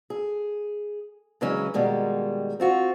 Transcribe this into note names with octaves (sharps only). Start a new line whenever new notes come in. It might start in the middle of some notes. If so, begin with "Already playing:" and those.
G#4
C#3 E3 F#3 G#3 C#4
B2 D#3 G3 G#3 A#3
C4 F4 F#4